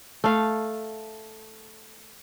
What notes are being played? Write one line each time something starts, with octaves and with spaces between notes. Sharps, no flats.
A3 F5